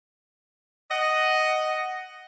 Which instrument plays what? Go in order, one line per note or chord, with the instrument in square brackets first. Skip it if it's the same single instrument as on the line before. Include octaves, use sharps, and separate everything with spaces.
[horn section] D#5 F#5